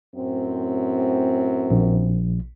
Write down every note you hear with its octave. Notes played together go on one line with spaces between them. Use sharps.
F#2 A2 C4
A#1